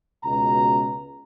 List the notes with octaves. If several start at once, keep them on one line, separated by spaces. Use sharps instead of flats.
C#2 B2 A#5